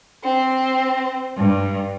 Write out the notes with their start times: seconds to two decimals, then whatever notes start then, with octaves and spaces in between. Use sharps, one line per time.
0.25 C4
1.35 G2